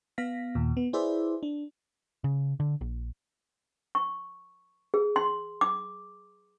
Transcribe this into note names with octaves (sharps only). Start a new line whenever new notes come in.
B3 F5 A#6 B6
D#2 A#2
B3
E4 G#4 B4 C5 D5 E5
D4
C#3
D3
A#1
C#6
G#4
C6
D6